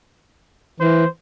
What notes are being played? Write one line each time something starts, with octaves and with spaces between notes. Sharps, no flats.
E3 C5